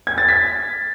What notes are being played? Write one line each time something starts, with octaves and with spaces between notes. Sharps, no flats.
G#6
A6
B6